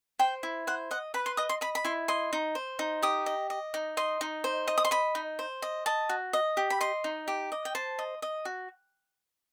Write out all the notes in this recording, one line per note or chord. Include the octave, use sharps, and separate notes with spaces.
C5 G5
E4
C5 F#5
D#5 F#5
B4 B5
C6
D#5 D#6
C6
D#5 B5
B5
E4 C6
D#5 C6
D#4
C5
D#4
G4 D#6
D#5
D#5
D#4
D#5 C6
D#4
C5
D#5
D#6
C6
D#5 B5
D#4
C5
D#5
D#5 A5
F#4
D#5
G4
B5
D#5 C6
D#4
G4
D#5
G5
C5 A5
D#5
D#5
F#4